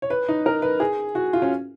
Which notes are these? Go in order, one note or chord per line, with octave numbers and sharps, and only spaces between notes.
C#5
B4
D#4
A#4
B4
G#4
F#4
F4
C#4